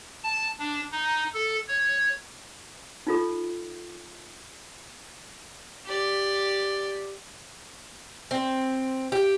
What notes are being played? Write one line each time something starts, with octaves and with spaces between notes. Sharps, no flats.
A5
D4
D#4
A4
C#5
D#4 F4 A4
G4 D5
C4
G4